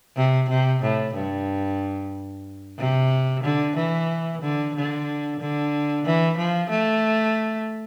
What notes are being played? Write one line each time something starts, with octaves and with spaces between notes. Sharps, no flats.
C3
C3
A2
G2
C3
D3
E3
D3
D3
D3
E3
F3
A3